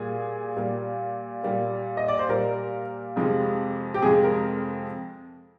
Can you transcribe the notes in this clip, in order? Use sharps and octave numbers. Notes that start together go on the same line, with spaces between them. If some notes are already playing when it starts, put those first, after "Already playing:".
Already playing: A#2 G3 A#3 G#4
A#2 G3 A#3
A#2 G3 A#3
D#5
D5
C5
A#2 G3 A#3 A#4
F2 C3 F3 G#3
G4
F2 C3 F3 G#3 G#4
A#4